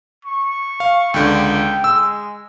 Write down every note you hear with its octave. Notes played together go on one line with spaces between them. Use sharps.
C#6
F5
C#2 D3 G5
G#3 E6